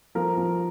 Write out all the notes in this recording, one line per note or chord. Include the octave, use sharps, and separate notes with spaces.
F3 A#4
F3